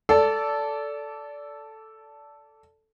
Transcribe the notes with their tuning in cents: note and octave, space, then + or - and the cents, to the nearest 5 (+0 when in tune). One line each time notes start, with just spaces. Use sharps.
A4 +0 D5 -20